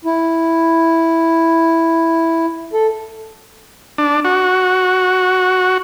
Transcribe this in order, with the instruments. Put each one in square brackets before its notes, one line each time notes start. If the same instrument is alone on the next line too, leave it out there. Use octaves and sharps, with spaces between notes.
[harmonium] E4
A4
[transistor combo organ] D4
F#4